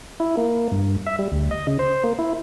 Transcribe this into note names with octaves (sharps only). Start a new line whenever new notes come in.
E4
A#3
G2
E5
G3
D2
D#5
C#3
C5
A#3
E4